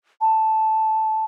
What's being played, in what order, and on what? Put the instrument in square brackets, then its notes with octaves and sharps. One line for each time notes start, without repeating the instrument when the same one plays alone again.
[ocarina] A5